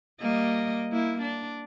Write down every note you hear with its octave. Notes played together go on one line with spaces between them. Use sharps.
G3 A#3 D#5
A#3 E4
D4